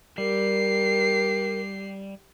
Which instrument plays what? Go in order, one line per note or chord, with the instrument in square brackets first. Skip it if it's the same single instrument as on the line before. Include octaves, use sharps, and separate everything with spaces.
[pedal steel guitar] G3 [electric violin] G4 C7 [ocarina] A#4